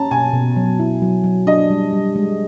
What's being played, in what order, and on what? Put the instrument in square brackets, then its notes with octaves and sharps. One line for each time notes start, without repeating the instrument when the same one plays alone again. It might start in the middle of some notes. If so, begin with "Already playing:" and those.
Already playing: [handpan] C#4 [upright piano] A5 A#5
[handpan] B2 [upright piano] G#5
[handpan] B2
F#3
E4
F#3
F#3
[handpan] D4 [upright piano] D#5
[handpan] G3
G3
G#3